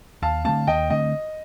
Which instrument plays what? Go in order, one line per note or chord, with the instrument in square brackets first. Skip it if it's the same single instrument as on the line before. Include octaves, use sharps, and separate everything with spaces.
[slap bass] D#2 [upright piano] F5 A5
[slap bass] D3 A3 C4 [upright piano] F5 A5
[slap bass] D#2 [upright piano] D#5 G5
[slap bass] D3 A3 C4 [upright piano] D#5